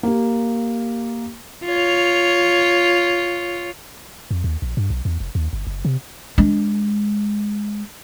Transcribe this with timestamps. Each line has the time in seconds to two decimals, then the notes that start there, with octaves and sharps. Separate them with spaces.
0.03 A#3 G4
1.65 F4 C#5
4.31 F2
4.44 D#2
4.62 A#1
4.77 G2
4.90 B1
5.05 E2
5.20 F1
5.35 D#2
5.53 G1
5.67 F#1
5.85 C3
6.38 G#3 D4